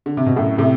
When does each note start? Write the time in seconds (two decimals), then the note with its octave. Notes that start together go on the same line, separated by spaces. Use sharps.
0.06 D3
0.17 C3
0.26 B2
0.36 F#2 A2
0.58 A2 C3